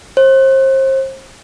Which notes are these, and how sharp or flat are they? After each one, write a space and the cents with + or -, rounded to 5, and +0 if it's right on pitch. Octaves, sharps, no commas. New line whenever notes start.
C5 +35